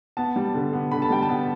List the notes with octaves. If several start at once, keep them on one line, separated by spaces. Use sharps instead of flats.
B3 A5
G3
D3
B3
D3 B5
A5
G3 G5
A5
B3